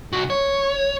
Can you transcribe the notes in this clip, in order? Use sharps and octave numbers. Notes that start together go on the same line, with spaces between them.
C2 F#4
C#5